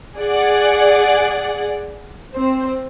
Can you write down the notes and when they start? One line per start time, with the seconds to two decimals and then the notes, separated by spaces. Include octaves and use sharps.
0.18 G#4 D5 F#5
2.34 C4 C5